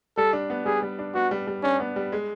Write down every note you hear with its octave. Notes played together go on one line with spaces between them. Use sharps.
G3 A4
D4
B3
G3 G#4
G3
D4
B3 F#4
G3
G3
C#4 D4
B3
G3
G#3